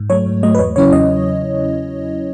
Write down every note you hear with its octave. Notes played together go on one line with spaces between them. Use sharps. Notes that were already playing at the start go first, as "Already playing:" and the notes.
Already playing: G#2
F#3 A3 C#5
G#2
F#3 A3 D#5
B4
E2 C#5
C#3 F#3 C#4 E4 C#5
E2 D#5